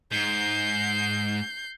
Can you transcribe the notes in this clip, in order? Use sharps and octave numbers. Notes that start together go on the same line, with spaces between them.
G#2 G6 C7